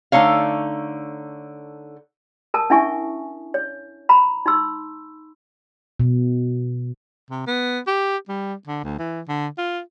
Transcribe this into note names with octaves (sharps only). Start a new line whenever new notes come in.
D3 A3 D#4 C#5 F5
A#4 A5 D#6
C#4 D4 E4 E5 G#5 C#6
C#5
A#5 B5
D#4 C6 E6
B2
C3
B3
G4
G3
D3
D2
E3
D3
F4